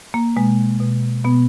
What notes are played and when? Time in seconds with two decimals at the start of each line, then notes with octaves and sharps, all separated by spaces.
0.14 A#3
0.36 B2 G#3
0.80 B2
1.24 B2 B3